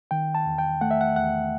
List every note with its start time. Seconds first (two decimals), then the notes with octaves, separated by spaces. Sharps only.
0.11 D#3 G5
0.35 A5
0.46 E2
0.58 G5
0.81 A3 F#5
0.91 E5
1.01 F#5
1.16 E2 F#5